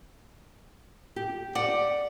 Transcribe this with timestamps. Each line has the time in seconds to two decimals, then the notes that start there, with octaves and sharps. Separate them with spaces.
1.16 G4
1.55 D5 F#5